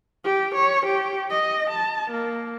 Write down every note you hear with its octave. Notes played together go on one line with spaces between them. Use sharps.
G4
C#5
G4
D#5
A5
A#3